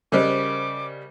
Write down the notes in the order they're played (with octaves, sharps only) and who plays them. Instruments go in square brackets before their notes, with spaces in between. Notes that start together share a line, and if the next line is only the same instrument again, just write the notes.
[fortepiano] C#3 G3 [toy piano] A#4 C5 D#5 [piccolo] D6